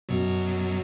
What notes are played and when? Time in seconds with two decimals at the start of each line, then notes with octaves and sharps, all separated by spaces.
0.09 F#2 B2 F#3